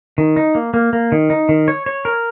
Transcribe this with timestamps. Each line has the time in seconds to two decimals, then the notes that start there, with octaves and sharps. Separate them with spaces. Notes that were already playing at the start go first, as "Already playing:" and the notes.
0.18 D#3
0.36 D#4
0.55 A#3
0.74 A#3
0.93 A#3
1.12 D#3
1.30 D#4
1.49 D#3
1.68 C#5
1.86 C#5
2.05 A#4